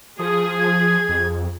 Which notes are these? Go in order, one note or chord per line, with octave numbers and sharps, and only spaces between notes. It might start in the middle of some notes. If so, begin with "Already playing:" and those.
F3 G#4 D#6
G#6
F2